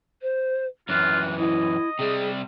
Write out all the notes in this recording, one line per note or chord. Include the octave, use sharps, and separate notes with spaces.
C5
F#2 E3 F4 F#6
E4 D#5
C3 G3 G#4